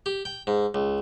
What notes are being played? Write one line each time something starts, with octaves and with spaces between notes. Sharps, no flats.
G4
G5
G#2
C#2